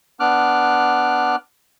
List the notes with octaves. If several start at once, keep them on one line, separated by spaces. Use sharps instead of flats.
B3 D4 D6 F6 F#6